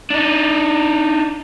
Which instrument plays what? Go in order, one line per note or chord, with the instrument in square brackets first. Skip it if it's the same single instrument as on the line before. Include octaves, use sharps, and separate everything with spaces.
[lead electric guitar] D4 D#4